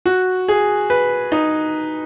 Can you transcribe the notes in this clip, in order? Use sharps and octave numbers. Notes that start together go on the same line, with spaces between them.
F#4
G#4
B4
D#4